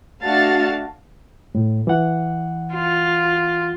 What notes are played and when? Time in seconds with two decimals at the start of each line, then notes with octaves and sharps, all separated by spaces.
0.23 A3 D4 F#4 F5 A5 A6
1.55 A2
1.87 E3 F#5
2.74 F4